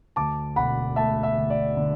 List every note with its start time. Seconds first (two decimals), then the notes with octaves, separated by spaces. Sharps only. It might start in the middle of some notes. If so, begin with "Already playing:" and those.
0.16 D2 A5 D6
0.56 E1 F#5 B5
0.96 A3 E5 A5
1.23 E5
1.37 D2
1.50 D5
1.77 D3